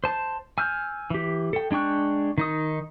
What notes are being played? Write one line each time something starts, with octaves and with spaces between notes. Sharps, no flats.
C5 A5
G#5 E6 F6 G6
E3 G4
A4 G5
G#3 D4 G5 C#6 F#6
D#3 D#4 D#6